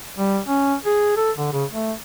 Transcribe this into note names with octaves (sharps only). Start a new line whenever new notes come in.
G3
C#4
G#4
A4
D3
C#3
A3